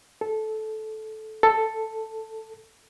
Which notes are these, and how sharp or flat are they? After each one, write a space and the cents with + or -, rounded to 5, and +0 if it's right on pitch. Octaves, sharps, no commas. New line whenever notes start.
A4 -15
A4 +5